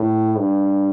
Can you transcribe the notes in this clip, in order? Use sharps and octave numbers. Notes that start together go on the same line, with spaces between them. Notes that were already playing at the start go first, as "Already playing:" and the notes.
Already playing: A2
G2